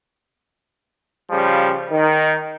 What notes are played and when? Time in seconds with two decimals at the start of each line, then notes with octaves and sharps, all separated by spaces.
1.30 C#3 F3 G3
1.91 D#3